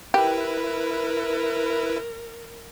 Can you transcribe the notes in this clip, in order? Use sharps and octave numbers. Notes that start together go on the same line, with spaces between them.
E4 G4 A#4 B4